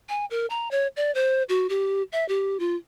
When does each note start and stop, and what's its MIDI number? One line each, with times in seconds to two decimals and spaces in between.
0.09 0.25 80
0.31 0.46 70
0.50 0.70 82
0.71 0.87 73
0.97 1.13 74
1.15 1.43 72
1.49 1.67 66
1.69 2.03 67
2.12 2.27 76
2.29 2.58 67
2.60 2.76 65